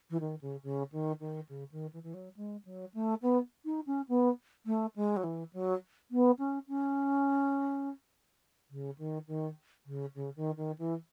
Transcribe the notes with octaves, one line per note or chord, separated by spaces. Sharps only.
E3
D#3
C#3
C#3
D#3
D#3
C#3
D#3
E3
E3
F#3
G#3
F#3
A3
B3
D#4
C#4
B3
A3
G#3
F#3
E3
F#3
B3
C#4
C#4
C#3
D#3
D#3
C#3
C#3
D#3
D#3
E3